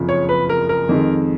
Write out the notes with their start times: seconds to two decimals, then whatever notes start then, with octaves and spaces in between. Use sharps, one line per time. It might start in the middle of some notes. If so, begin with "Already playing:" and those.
Already playing: F#1 F2 C#3 F3
0.09 C#5
0.29 B4
0.49 A#4
0.69 A#4
0.89 F2 D#3 G#3